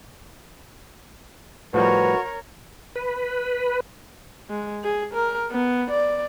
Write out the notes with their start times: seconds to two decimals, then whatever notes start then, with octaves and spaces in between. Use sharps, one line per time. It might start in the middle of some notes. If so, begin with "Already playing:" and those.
1.74 A2 F3 G3 F#4 A#4 B4 C#5
2.96 B4
4.50 G#3
4.84 G#4
5.14 A#4
5.51 B3
5.91 D5